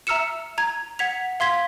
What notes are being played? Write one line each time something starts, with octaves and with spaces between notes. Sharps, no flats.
E5 A#5 E6 F6 C#7 E7
A#5 G#6
F#5 G#6 B6 F7
F5 C6 G#6 B6